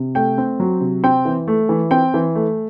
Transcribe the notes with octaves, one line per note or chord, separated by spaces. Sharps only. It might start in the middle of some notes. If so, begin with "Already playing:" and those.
Already playing: C3
A3 G5
C4
F#3
C3
C4 G5
E3
A3
E3
C4 G5
E3
A3